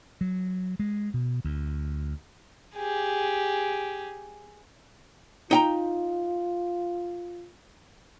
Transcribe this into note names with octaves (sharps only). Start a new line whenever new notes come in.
F#3
G#3
B2
D2
G4 G#4
D#4 F4 G5 A#5